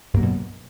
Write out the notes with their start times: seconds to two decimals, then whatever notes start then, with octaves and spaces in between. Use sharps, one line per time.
0.14 G2
0.17 A#3
0.20 F#3
0.22 B2